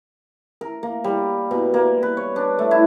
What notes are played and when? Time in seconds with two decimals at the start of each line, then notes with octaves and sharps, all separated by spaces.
0.61 A#4
0.83 A#3
1.04 G3
1.51 B2
1.74 A#3
2.03 B4
2.17 C#5
2.36 D4
2.59 A3
2.71 E4